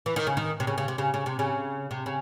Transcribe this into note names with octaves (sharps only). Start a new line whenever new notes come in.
E3
D#3
C#3
D#3
C3
C#3
C#3
C3
C#3
C#3
C3
C#3
C3
C#3